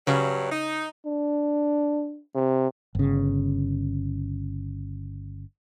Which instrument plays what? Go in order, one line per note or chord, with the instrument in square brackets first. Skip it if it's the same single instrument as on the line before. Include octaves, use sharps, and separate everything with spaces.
[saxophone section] G2 F#3 [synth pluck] C#3
[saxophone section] D#4
[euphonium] D4
C3
[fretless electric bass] G1 C#3